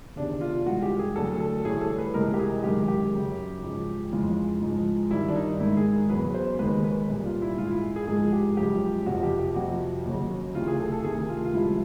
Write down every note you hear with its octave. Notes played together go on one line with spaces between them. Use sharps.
E2 C3 D#3 D4
F4
G2 E3 G#3 F#4
G4
G#4
D2 D3 F#3 A4
A4
A2 E3 G3 G#4
A4
B4
C#2 C3 E3 G3 A#4
G4
G#4
F#2 D#3 G#3 G4
G4
F#2 C#3 F#3
G#2 F3 G#3
F2 C#3 E3 G#3 F4
G#2 F3 G#3
G2 D#3 G3 E4
D4
D#4
G#2 D#3 G#3 E4
G#4
E2 C#3 F#3 B4
C5
D#2 D#3 G#3 B4
B4
C2 A#2 G3
F4
E4
G#2 E3 G#3 F4
E4
G#4
G#2 F3 G#3 G#4
G4
F#2 C#3 F3 G#3 G4
F2 C3 F3 F#4
G4
G4
F2 C3 F3 F#4
D#2 C#3 F#3
D2 C3 E3 F4
G#4
A4
A4
D2 C3 D#3 G#4
F4
F4
C2 C3 F3 G#3 E4